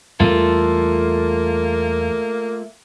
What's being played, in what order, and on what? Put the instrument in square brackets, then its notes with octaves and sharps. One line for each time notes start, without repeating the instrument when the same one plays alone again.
[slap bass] E2 G3 [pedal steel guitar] A3 F4 A4 [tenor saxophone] A#3